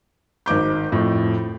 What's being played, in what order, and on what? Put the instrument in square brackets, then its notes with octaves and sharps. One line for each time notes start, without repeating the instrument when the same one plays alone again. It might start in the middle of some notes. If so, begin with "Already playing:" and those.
[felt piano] G#1 D#4 D6 G6
F2 A2